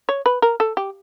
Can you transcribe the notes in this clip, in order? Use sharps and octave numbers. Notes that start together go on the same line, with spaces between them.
C#5
B4
A#4
A4
G4